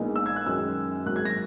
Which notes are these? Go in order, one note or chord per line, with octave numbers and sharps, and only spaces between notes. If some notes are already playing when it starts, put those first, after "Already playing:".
Already playing: A#1 A#2 G#3 B3 D#4
E6
G#6
F#6
F#2 D#3 G#3 C#4 E6
G#1 G#2 F#3 A#3 F#6
G#6
A#6